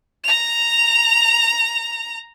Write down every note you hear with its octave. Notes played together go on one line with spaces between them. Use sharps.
A#5 F7